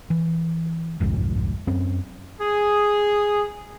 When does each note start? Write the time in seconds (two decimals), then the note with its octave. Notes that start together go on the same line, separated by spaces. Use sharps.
0.10 E3
1.01 G1 C2 F2 G#2
1.67 F#2 C4 C#4
2.41 G#4